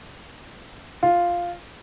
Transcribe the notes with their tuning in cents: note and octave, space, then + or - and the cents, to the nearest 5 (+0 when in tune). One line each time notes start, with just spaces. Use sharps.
F4 +0